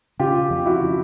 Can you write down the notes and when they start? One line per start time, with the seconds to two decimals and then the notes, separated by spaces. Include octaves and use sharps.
0.19 C#3 F4 G4
0.50 F2
0.66 E4 F#4
0.82 F3